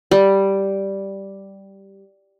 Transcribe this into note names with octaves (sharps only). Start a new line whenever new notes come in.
G3